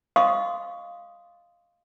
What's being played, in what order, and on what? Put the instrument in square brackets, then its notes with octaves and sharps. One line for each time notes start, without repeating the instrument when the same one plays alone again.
[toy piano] D#5 F5 C6 C#6 D#6